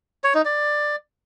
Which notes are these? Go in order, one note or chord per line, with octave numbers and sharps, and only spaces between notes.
C#5
D#4
D5